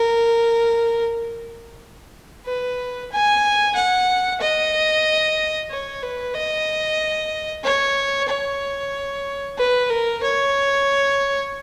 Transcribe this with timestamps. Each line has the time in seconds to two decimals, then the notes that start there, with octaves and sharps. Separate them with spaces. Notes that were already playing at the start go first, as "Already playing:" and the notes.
Already playing: A#4
2.46 B4
3.12 G#5
3.75 F#5
4.41 D#5
5.70 C#5
6.03 B4
6.34 D#5
7.64 C#5
8.29 C#5
9.58 B4
9.90 A#4
10.23 C#5